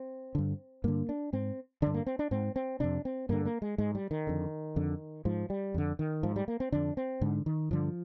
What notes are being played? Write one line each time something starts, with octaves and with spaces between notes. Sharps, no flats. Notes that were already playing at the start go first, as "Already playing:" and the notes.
Already playing: C4
G2 D3
G2 D3 A#3
D4
G#2 C4
G2 D3 D4
A#3
C4
D4
G#2 C4
C4
F2 C3 D4
C4
G2 D3 A#3
A#3
G#3
G#2 G#3
G3
D#3
F2 D3
F2 D3
G#2 F3
G3
F2 D3
D#3
G#2 F3
G3
A#3
C4
F2 D3 D4
C4
G#2 D3
D#3
G2 D3 F3